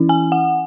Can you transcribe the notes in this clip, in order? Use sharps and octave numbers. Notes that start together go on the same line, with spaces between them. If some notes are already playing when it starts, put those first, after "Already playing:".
Already playing: E3 C#4 E4
G#5
F#5